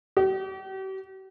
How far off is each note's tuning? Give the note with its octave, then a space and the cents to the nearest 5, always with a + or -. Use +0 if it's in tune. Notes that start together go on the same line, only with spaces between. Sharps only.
G4 -45